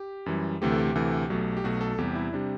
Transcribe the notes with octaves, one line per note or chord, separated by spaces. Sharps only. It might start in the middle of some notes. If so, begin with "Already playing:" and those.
Already playing: G4
F#2 E3 G3
D2 C3 E3 A3 G4
A4
G4
D2 C3 E3 A3
B1 B2 F#3 A3
G4
B1 B2 F#3 A3 F#4
A4
E2 C3 G3 G4
E4
C3 G3 D4